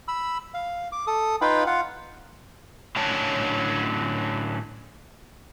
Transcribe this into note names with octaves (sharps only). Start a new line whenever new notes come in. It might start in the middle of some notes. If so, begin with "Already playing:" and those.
B5 E6
F5
D6
A4 D#6
D#4 F4 B4 F5 G5 B5
F4 F5 F#5
A2 D3 F#3 C#4 C#5 A5